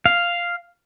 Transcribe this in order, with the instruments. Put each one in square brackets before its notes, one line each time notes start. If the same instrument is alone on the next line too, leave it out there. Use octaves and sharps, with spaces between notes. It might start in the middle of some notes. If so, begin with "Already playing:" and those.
[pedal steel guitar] F5